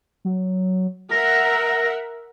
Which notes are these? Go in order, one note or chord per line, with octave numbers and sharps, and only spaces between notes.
F#3
A#4 E5 F#5 A#6